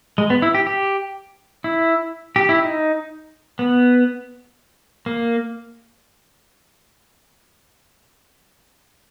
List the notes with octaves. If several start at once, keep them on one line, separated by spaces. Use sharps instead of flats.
G#3
B3
E4
G4
G4
E4
G4
E4
D#4
B3
A#3